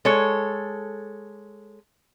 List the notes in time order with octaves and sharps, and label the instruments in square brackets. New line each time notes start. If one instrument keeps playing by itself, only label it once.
[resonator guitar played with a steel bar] G#3 A4 C#5